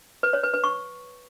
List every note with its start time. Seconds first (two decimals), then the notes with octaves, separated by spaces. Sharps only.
0.23 B4
0.33 C#5
0.43 B4
0.53 B4
0.64 C#6